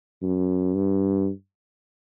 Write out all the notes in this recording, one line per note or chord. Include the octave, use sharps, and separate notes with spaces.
F#2
G2